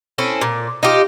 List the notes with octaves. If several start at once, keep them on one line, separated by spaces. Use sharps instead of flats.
C4 C#4 E4 A4
A#2
D#4 F4 G4